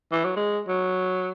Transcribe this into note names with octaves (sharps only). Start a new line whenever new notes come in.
E3
F#3
G#3
F#3